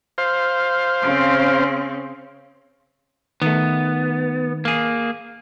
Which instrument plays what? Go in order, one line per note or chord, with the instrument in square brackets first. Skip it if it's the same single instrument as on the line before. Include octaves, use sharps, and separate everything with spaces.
[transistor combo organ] C5 F5
[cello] C#3 C4
[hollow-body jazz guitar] D#3 A3 [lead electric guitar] B3
[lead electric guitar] A#3 G#4